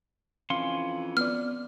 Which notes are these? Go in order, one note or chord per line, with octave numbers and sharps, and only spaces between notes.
F2 E3 C#4 F5 C6
B3 D5 F6